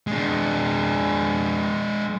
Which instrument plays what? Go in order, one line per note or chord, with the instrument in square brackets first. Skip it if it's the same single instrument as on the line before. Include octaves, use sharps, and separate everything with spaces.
[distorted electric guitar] G#3 D4